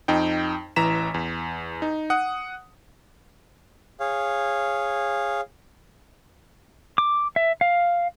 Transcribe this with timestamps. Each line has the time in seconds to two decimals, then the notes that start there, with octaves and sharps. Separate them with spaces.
0.08 F2 D#4 G5
0.76 A1 E3 A#5 B6 E7
1.14 E2
1.82 D#4
2.10 F#5 D#6
4.00 G#4 C#5 F5
6.98 D6
7.36 E5
7.61 F5